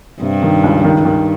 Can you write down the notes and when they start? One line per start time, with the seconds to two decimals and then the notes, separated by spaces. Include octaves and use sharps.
0.21 G2 C3
0.42 D#3
0.63 C#2
0.84 D#3
1.05 G2 D#3